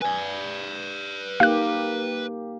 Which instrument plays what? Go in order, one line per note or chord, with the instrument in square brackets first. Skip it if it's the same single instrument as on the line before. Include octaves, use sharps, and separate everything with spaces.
[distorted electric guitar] B4 D5 [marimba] G#5
[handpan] A#3 G4 [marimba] D#4 [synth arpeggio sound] F5 F#6